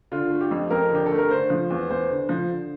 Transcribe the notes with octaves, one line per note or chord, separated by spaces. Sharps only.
D3 F4
A3
G4
F2
F2 A#4
D3 G4
A3 A4
A#4
D3 C5
F3
E2
E2 C5
D3
F3
D3